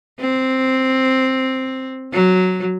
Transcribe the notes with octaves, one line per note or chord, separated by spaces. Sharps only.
C4
F#3